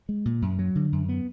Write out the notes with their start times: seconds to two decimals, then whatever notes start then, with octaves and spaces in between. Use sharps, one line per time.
0.09 G#3
0.25 A#2
0.42 F#2
0.59 F#3
0.75 D3
0.92 F#2
1.09 B3